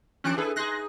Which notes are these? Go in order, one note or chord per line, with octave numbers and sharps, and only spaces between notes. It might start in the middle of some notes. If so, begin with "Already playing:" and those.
D#2 E3 C#4 D4 F#6 D7
D4 E4 G#4 A4 B4
D#4 G#4 C6 F#6 A#6